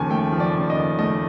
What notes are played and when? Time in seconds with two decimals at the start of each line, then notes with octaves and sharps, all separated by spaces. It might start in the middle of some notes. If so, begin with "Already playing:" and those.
Already playing: D#2 C#3 F3 G#5 A5
0.10 A3 G5
0.32 F3
0.40 D5
0.55 C#3
0.70 D#5
0.77 D#2
0.99 A3 D#5